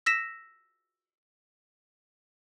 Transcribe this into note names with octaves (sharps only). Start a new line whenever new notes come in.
E6 A#6 B6 E7